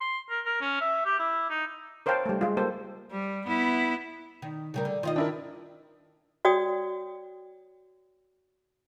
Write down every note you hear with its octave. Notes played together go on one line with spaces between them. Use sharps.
C6
A#4
A#4
C#4
E5
G4
E4
D#4
A#4 C5 C#5 F5 G5 A5
G3 A3
G#3 F4
G3 A#3 A4 C5
G3
B3 E4
D#3
C#3 G3 A#4
D3
D#3 F4 D#5
D4 E4 A#4
F#4 C#5 D5 G5 D#6